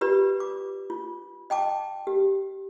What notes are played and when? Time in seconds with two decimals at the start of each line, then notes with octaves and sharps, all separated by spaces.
0.01 F4 G4 B4 D5
0.40 D6
0.90 F4
1.50 D#5 G5 A5 D6
2.07 G4